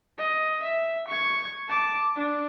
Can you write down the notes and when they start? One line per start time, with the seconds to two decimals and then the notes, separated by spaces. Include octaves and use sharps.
0.18 D#5
0.63 E5
1.08 C#6 G#6
1.68 A5 D6
2.16 D4